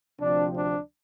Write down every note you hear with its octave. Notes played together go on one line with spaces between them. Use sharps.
D2 C3 F3 C4 D4
D4